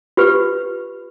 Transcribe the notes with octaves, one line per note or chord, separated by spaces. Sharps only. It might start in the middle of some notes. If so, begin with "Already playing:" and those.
F4 G4 B4